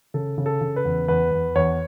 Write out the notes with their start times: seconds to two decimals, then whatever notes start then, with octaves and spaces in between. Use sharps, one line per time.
0.14 C#3 A4
0.38 C#3
0.46 A4
0.61 C#3
0.76 B4
0.85 E2
1.08 E2 B4
1.31 E2
1.55 E2 C#5